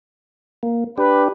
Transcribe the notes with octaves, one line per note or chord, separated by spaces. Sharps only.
A#3
D4 G4 B4